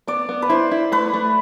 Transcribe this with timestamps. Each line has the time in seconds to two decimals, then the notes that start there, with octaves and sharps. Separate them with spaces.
0.08 B3 D5
0.29 B3
0.42 B4
0.49 E4 C5
0.71 E4
0.92 A3 B4
1.13 A3